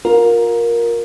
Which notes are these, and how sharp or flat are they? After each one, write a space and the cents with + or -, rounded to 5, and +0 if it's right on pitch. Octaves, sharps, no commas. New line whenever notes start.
F4 +35 A#4 +10